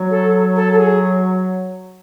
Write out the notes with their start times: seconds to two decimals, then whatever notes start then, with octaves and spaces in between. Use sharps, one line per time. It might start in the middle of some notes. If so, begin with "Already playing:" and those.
Already playing: F#3
0.10 A4
0.56 A4
0.73 A4
0.78 G#4